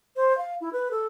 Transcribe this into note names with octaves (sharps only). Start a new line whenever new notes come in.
C5
F5
E4
B4
A4